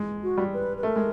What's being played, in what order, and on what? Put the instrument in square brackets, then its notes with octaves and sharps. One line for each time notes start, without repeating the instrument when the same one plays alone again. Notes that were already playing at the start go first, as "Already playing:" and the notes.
Already playing: [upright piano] G#3
[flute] F#4
[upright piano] G3
[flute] B4
B4
[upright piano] A3 [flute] A#4
[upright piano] G#3